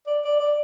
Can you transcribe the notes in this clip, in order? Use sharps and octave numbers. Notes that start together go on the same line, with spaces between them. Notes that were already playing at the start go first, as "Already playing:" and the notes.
D5
D5
D5